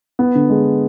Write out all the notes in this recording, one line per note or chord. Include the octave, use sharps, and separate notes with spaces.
B3
D3
G#3